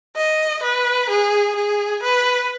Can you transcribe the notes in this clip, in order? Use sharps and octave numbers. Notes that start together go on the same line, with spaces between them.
D#5
B4
G#4
G#4
B4